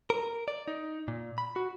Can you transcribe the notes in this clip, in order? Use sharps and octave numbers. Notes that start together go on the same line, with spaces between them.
A#4
D5
D#4
A#2
B5
F#4